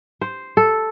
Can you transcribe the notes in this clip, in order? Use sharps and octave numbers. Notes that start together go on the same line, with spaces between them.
C5
A4